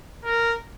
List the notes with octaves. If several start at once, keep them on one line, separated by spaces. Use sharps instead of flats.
A#4